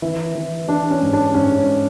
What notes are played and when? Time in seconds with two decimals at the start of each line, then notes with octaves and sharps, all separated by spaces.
0.02 E3 E4
0.35 E3
0.68 E3 D4
0.91 C#4
1.02 G#2
1.13 D4
1.34 G#2 C#4